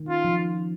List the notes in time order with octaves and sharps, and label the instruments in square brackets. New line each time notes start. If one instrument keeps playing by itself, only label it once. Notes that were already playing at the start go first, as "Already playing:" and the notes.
Already playing: [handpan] D#3
[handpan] C#4 [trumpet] F4
[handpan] F3